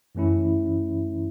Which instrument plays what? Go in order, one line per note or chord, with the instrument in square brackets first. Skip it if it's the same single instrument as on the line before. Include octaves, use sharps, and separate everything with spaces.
[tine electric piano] F#2 E3 A3 C#4 E4